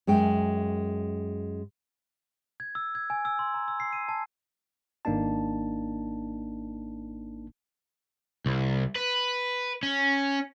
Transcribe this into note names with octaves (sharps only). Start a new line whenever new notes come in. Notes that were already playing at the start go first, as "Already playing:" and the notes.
F#2 G#3 E5 G5
G#6
E6
G#6
G#5
E6
C6
A#5
E6
C7
D#7
A5
G#1 A#3 D4 D#4 A5
C2
B4
C#4